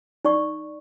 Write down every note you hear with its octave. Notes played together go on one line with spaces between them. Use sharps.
D#4 D5 C#6